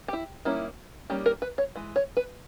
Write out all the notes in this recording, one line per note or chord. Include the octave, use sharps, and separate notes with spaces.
G4
E4
D#3 G3 A#3 C#4 E4
D#3 G3 A#3 C#4 G4
A#4
B4
C#5
E3 G#3
C#5
B4